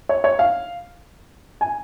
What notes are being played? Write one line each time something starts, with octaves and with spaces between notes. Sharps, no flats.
C#5
C#5
F5
G#5